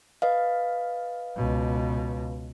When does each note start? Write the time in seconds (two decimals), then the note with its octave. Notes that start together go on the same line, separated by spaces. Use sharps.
0.22 B4 D#5 F5
1.36 C#2 B2